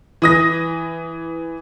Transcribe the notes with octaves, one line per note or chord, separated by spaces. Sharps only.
E3 D#6 A#6